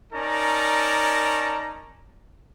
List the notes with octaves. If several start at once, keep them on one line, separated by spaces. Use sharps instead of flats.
C#4 D#4 A#4 D5 A5 A#5